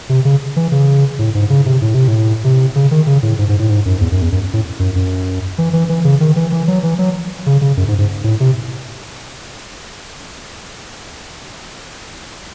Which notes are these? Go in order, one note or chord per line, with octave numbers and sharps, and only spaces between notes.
C3
C#3
E3
C#3
A2
G#2
C#3
C3
A2
C3
A2
C3
C#3
D#3
C#3
A2
G#2
G#2
A2
G#2
F#2
E2
F#2
E2
F#2
A2
F#2
F#2
E3
E3
E3
C#3
D#3
E3
E3
F#3
E3
F#3
C#3
C#3
F#2
G#2
G#2
A2
C3